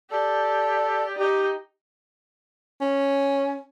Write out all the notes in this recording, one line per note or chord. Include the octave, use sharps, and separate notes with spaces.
G4 A4 D5
D#4 G4
C#4